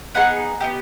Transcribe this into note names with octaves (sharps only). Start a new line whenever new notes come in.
B3 D#4 G#4 F#5
B3 E4 G4